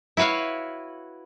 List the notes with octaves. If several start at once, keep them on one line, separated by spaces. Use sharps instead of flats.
E4 F#4 B4 C#5 F5